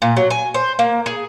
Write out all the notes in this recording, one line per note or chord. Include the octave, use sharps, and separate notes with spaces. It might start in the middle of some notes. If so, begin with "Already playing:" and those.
A#2
F#3
G#5
C5
A#3
G#4